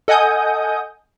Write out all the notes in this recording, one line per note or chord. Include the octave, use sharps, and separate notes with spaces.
A4 D#5 F#5 G#5 D#6 G6